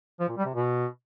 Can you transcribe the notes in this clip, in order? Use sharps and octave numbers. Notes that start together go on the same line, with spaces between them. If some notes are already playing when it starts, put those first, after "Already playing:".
F3
A#2
G3
C3
B2